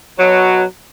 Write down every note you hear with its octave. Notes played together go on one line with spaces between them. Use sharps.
B2 F#3